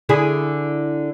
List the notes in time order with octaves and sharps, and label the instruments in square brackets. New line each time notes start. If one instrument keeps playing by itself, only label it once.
[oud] D3 E4 G#4